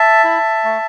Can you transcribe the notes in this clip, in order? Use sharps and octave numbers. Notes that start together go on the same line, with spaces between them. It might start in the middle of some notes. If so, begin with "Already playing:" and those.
Already playing: E5 A5
E4
A3